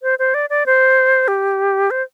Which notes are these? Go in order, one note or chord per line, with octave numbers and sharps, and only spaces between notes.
C5
C5
D5
D5
C5
G4
C5